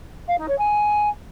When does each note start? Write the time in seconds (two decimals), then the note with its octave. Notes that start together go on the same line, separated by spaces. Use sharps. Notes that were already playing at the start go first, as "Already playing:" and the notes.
0.28 F5
0.38 D#4
0.48 C#5
0.58 G#5